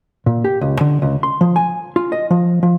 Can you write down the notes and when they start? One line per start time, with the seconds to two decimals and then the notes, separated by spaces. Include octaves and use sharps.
0.26 A#2
0.44 G4
0.61 C#2
0.81 D3
1.02 C#2
1.23 C6
1.41 F3
1.56 G#5
1.96 F4
2.12 D#5
2.31 F3
2.63 F3